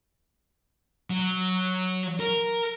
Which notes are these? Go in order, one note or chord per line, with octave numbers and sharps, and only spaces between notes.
F#3
A#4